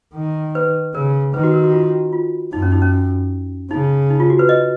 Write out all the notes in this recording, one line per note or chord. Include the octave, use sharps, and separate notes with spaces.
D#3
B4
C#3 A#4
D#3 B4
F#4
A#4
F#4
F4
F#4
F4
F#2 D#4
C#4
D#4
C#4
C#3 D#4
D#4
F4
F#4
B4
D#5